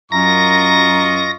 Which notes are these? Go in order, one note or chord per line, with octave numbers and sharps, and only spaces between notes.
F#2 F4 D#5 A#5 C#6 A#6